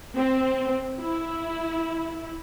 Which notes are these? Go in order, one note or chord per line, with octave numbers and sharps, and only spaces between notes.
C4
E4